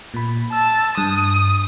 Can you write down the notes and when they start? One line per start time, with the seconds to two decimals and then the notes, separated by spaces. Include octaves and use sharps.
0.14 A#2 B5
0.53 A5 E6
0.98 G2 D#6